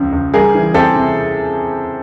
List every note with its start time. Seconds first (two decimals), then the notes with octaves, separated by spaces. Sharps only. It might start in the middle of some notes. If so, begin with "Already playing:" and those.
Already playing: C#2 C#3 F3
0.13 C#2
0.34 G3 G#4 A#4
0.54 E3
0.74 C4 G4 A4
0.95 C3